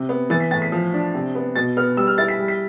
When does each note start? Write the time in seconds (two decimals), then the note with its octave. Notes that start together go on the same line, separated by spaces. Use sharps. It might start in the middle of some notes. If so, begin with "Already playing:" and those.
Already playing: C3
0.09 B3
0.30 E3 A6
0.40 B6
0.51 A2 A6
0.62 B6
0.72 F3
0.94 D4
1.14 C3
1.35 B3
1.56 B2 A6
1.77 B3 F6
1.97 G3 E6
2.07 F6
2.18 E4 A6
2.28 B6
2.39 G3
2.48 B6